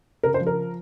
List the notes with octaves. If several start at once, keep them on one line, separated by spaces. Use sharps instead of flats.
C#3 A#4
C5
F3
A#4